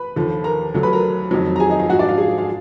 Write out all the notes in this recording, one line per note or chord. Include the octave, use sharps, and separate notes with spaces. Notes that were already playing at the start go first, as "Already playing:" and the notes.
Already playing: B4 B5
D#2 D3 F3
A#4 A#5
D2 D3 F#3
B4 B5
A#4 A#5
F2 D#3 F#3
A#5
G#4 G#5
D#4 D#5
F4 F5
G#2 F3 F#4 F#5
D4 D5
F4 F5
G#4 G#5
F4 F5